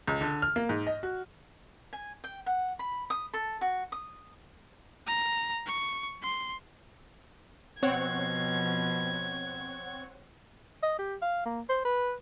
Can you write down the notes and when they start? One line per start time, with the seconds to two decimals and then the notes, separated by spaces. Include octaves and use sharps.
0.07 C#2
0.21 D3
0.42 F6
0.56 A#3
0.69 G#2
0.87 D#5
1.03 F#4
1.93 G#5
2.24 G5
2.46 F#5
2.79 B5
3.10 D#6
3.33 A4
3.61 F#4
3.92 D#6
5.07 A#5
5.66 C#6
6.23 C6
7.83 B2 F3 C4 C#5 F#5 G#6
10.83 D#5
10.98 G4
11.22 F5
11.46 A#3
11.70 C5
11.85 B4